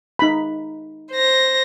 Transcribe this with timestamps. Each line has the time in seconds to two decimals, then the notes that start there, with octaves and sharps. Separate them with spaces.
0.19 D#4 B5
1.13 C5 A#6